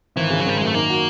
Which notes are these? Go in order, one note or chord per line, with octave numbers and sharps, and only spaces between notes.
G#1 E3
C#3
F#3
G#1 G3
F#2 G#3
A3
D#3 A#3
F#4